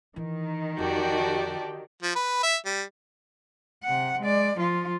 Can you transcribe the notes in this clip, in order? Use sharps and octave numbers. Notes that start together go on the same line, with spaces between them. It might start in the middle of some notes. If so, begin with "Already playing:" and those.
D#3 E3
F2 F#4 G4 D5 G5 A5
F3
B4
E5
G3
C3 F#5
G#3 D5
F3 F4